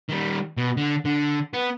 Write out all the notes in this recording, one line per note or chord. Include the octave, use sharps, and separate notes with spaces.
D#3 G3
B2
D3
D3
B3